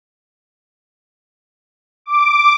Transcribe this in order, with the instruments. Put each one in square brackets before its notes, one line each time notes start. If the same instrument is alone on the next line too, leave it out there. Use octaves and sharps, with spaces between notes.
[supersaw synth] D6